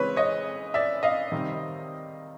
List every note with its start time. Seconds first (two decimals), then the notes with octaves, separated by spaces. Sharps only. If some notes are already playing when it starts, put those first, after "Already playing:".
Already playing: C#3 E3 G#3 C4 B4 C#5
0.16 C#5 D#5
0.74 D5 E5
1.03 D#5 F5
1.32 C3 D#3 G3 C4